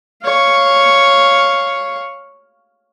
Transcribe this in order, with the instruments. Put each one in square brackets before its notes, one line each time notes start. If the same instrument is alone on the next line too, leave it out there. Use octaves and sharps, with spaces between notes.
[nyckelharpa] C#5 F5